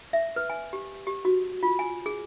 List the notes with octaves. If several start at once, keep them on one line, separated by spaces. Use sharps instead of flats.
E5
B4
G#5
G4
G4
F#4
F4
G#5
G#4